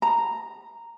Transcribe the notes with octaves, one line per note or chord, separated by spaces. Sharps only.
A#5